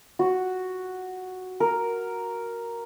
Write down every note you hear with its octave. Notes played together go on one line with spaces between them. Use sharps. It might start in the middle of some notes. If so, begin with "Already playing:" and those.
F#4
A#4